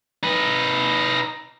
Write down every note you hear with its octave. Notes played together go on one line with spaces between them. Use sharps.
D#4 B4